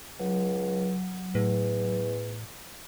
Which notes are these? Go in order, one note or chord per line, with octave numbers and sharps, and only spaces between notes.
C#2 F#3
E2 A2